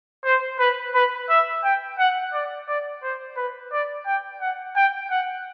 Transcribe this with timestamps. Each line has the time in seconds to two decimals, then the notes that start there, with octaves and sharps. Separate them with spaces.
0.25 C5
0.59 B4
0.94 B4
1.30 E5
1.64 G5
1.99 F#5
2.33 D5
2.68 D5
3.03 C5
3.37 B4
3.72 D5
4.06 G5
4.41 F#5
4.76 G5
5.11 F#5